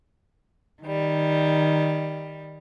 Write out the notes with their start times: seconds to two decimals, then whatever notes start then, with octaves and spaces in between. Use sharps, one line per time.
0.83 D#3 G3